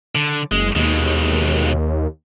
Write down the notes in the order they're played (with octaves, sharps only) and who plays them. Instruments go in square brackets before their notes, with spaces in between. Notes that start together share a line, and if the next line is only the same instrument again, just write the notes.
[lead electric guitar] D3
[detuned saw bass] F#1 [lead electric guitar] G#3
[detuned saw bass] D#2 [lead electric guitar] B2 G#3